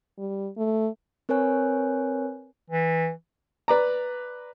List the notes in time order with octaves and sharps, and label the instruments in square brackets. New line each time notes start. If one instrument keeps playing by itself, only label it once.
[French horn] G3
A3
[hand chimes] C4 A#4 B4 C#5 G#5 F#6
[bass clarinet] E3
[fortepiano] B4 D5 A#5